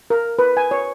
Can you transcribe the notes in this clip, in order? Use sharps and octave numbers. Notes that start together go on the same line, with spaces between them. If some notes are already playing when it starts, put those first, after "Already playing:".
A#4
B4
G#5
C#5